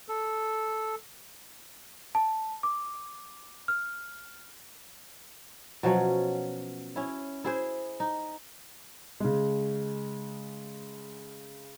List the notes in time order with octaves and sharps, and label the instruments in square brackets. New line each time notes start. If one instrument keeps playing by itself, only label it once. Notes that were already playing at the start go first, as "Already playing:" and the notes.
[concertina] A4
[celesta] A5
D6
F6
[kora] B2 F3 F#3 C#4
C#4 E4
E4 G#4 C5
D#4
[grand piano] C#3 G#3